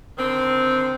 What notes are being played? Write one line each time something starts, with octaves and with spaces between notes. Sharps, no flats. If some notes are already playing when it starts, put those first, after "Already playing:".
D3 D#3 C4